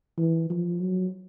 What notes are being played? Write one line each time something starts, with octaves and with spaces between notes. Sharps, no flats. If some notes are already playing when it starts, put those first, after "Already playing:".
E3
F3
F#3